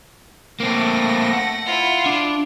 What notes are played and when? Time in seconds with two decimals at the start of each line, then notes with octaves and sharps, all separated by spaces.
0.60 A3 A#3 C4 A#6
1.33 F#5
1.66 E4 F4
2.06 D4